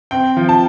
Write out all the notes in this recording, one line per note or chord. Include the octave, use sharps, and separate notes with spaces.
C4 G5
F3
A5